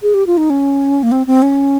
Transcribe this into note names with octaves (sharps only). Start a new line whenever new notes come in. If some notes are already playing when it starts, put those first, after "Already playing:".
G#4
G4
F4
D#4
C#4
A#3
C4
C4
C#4